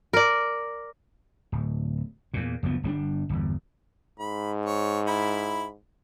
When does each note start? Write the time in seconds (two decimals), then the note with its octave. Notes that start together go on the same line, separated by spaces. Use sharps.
0.13 A#4 D5
1.52 D1
2.34 E2 A#2
2.63 F#1 D2 F3 B3
2.83 G1 G3 C#4 D4
3.29 G1 E2
4.20 G#2 B5
4.66 C#5
5.07 E4 B5